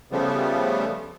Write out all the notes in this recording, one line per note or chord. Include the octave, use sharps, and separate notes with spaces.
C#3 F3 G3 A3 B3